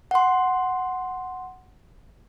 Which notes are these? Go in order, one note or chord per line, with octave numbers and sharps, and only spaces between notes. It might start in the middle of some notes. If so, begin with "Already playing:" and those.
F#5 C6